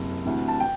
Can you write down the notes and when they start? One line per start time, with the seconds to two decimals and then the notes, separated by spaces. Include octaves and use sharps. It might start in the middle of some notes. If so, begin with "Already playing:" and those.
Already playing: F#1 C3
0.23 D2 C3 E3
0.48 A5
0.60 G5